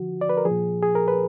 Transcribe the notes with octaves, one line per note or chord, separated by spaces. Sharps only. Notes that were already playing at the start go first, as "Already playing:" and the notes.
Already playing: D3 F3 F#4
D5
B4
A#4
F3 G#4
A#2
G#4
A#4
B4